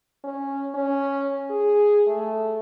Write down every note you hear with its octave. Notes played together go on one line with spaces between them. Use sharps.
C#4
C#4
G#4
A3